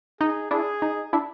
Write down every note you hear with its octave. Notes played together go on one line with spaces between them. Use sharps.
D#4 G#4
D4 E4 G#4
D#4
D4 E4